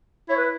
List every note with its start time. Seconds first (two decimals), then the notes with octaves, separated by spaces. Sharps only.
0.29 E4 C#5
0.37 B4